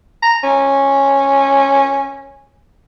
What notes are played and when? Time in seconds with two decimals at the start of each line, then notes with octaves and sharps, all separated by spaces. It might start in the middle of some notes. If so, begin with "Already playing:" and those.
0.22 A#5
0.43 C#4